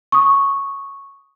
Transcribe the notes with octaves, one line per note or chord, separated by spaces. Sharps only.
C#6 D#6